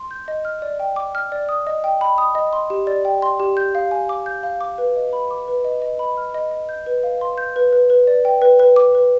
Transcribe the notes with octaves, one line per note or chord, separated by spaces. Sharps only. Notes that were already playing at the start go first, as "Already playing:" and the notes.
Already playing: C6
G6
D#5
F6
D5
G5
D6
F6
D5
D#6
D#5
G5
B5
D#6
D#5
C6
G4
D5
G5
C6
G4
G6
F5
G#5
D6
G6
F5
D6
B4
D#5
B5
D6
B4
D#5
D#5
B5
F6
D#5
D#5
G6
B4
F5
C6
G6
B4
B4
B4
D5
G5
B4
B4
D6
B4